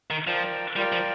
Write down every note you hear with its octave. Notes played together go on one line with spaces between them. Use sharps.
D#3
F3 F4 A#4 D5 G5
G3 F4 A#4 D5 G5
F3